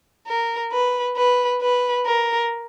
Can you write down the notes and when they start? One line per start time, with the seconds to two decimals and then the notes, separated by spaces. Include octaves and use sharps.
0.28 A#4
0.72 B4
1.17 B4
1.62 B4
2.06 A#4